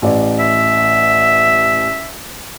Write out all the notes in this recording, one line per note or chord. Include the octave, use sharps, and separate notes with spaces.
A1 D5
E5